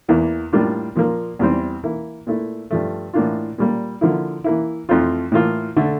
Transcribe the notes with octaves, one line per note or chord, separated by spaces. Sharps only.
E2 E3 A#3 E4
A2 G3 A#3 D4 F4
A#2 F3 A#3
E2 E3 G3 C4
E3 A#3 E4
A#2 A3 E4
G2 F3 A3
A2 E3 A#3 D4 F4
A#2 G3 A#3
D3 F3 A#3 E4
E3 A#3 E4
F2 E3 A3 C4 F4
A2 E3 A#3 F4
D3 A3